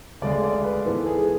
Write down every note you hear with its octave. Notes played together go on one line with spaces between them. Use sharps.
D2 C#3 G#3 D5
D5
B4
G#2 E3 B3 A4
G#4